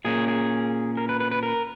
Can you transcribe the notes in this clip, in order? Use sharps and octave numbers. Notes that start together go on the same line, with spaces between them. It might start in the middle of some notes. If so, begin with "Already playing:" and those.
A#2 A#3 C#4 G#4
G#4
A#4
B4
B4
B4
A#4